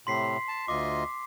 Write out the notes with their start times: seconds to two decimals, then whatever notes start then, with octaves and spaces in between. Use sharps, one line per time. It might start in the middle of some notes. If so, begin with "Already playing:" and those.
0.07 A2 C3 C6 B6 C7
0.48 A5
0.68 D2 F4 D#5 D6